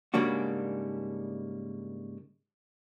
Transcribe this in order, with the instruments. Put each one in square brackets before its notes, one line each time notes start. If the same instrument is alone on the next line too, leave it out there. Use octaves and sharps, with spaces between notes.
[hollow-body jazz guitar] G#2 C#3 G3 A#3 D4 F#4